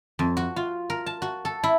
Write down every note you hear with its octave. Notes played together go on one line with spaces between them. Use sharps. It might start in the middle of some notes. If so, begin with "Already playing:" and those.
F2
F#4
F4
A#4
A5
F#4
A4
E4